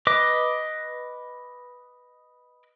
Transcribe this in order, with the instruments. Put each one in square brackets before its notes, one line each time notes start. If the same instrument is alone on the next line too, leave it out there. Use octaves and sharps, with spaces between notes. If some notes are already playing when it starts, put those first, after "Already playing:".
[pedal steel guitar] B4 D#5 D6